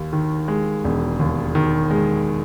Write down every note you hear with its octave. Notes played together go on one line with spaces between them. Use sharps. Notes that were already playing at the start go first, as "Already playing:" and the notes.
Already playing: D#2
D#3
G#3
E1
D#2
D#3
G#3